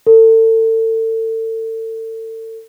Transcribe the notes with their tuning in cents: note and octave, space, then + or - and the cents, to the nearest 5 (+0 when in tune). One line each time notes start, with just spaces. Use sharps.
A4 +35